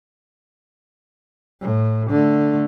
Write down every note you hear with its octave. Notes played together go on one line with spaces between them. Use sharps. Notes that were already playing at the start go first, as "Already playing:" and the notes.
A2
D3 A3